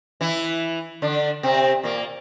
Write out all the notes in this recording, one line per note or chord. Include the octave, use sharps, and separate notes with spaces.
E3 E4
D3 D4
C3 C4
A#2 A#3